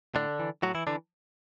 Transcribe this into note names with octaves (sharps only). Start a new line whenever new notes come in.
A2 D3 D4
E3
A2 F#3 F#4
E3 E4
D3 E3 D4